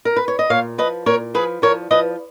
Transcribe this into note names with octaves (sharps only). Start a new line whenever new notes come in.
A#4
B4
C#5
D#5
A#2 C#5 F5
F3 B4 D#5
A#2 A#4 C#5
F3 G#4 B4
F3 A#4 C#5
F3 B4 D#5